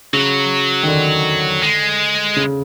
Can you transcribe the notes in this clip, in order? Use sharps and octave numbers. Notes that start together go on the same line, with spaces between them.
C#3 F#3
D#3
D3
G#3
C#3